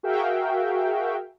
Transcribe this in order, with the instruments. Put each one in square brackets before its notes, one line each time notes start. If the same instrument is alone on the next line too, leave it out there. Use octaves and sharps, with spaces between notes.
[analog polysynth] F#4 G#4 A#4 E5 F5 G5